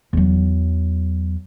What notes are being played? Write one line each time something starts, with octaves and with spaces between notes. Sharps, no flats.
E2 F#3